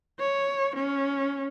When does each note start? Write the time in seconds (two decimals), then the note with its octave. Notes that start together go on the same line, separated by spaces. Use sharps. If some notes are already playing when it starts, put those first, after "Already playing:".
0.20 C#5
0.76 C#4